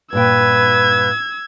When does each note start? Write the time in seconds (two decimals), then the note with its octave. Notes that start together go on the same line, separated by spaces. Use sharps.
0.13 G2 A#2 B4 G5 E6 G#6